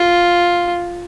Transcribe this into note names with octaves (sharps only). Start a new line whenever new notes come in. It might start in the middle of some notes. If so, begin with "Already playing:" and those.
Already playing: F4